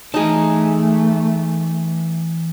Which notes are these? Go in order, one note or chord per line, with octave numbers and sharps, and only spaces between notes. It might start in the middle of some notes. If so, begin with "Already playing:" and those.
E3 A3 D#4 G#4 A5